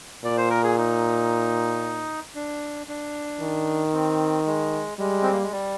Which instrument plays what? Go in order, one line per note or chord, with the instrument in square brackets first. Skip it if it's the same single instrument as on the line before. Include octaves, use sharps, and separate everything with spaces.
[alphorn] A#2 [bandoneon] D5
[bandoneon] C5
A#4
G#4
D#4
D4
D4
[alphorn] D#3
[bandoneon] C4
G#3
[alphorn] G3 [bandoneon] G#3
[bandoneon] C4
A#3
G#3
G3